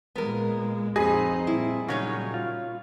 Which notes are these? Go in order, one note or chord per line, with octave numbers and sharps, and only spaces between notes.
A#2 G#3 B3 A#4
F2 C4 D#4 G#4 B4 D#5
A#2 G3 E4
C#3 F#3 C#4 D#4 F#4 C#5
F4